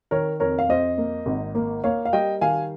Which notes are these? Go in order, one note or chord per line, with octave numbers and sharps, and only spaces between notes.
D#3 A#4 C#5
F2 A#4 C#5
F5
F2 C5 D#5
A#3
G#1
A#3
A#3 C#5 F5
F5
G3 D#5 G5
D#3 F5 G#5